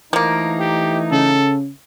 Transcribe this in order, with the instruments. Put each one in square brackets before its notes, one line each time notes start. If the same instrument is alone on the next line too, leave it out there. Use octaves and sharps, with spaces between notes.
[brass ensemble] E3 A3 D#4 [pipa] F3 A#3
[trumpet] G4
[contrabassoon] C#3 [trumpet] A4